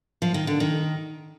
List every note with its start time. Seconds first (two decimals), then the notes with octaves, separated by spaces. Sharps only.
0.22 F3
0.34 D#3
0.47 D3
0.60 D#3